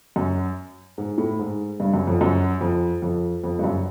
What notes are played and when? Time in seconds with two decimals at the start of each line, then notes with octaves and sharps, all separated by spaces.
0.16 F#2
0.98 G#2
1.18 A2
1.39 G#2
1.80 G2
1.93 F#2
2.07 F2
2.21 F#2
2.61 F2
3.02 F2
3.44 F2
3.59 G2
3.64 F#2